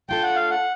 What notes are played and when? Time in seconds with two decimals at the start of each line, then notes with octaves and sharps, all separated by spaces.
0.09 A3 D4 F4 A4 G5
0.23 F#5
0.36 F5
0.51 F#5